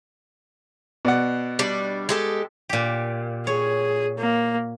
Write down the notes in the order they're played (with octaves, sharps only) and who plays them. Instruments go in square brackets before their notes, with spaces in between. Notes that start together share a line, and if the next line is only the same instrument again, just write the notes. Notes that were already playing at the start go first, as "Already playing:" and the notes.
[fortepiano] B2 D5 F#5
[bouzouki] G3 D4
G#3 G4 A4
[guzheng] A#2 G4
[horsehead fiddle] G#4 [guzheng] C#5
[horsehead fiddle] A#3